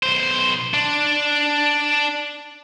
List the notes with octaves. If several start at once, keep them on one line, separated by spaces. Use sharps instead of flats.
B1 C5
D4